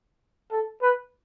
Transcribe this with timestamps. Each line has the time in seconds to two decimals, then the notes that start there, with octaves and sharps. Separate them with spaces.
0.51 A4
0.82 B4